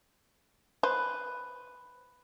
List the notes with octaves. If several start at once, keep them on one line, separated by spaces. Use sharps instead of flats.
B4 C5